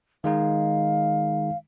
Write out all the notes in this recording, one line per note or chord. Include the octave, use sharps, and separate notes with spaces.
D#3 G#3 D#4 F5